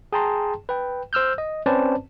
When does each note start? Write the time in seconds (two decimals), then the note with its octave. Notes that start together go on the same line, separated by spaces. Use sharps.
0.13 G#4 G5 A5 A#5 C6
0.69 B4 G5
1.13 C5 E6 F6 G6
1.38 D#5
1.66 C4 C#4 B4 C5 D5 A5